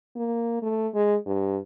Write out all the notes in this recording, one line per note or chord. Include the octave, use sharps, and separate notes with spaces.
A#3
A3
G#3
G2